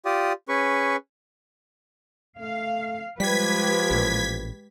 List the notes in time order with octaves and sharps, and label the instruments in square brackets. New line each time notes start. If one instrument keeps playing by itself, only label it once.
[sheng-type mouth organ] F4 G4 D5 D#6
C#4 G#4 B4 C#6
[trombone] A3 [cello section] F5
[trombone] F3 [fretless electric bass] G3 [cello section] G#3 G4 B4 [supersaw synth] G#6 B6
[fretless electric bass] A1 A#2